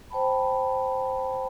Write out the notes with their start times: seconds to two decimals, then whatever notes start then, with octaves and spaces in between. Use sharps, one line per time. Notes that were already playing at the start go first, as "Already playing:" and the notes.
0.11 C5 G5 A5 B5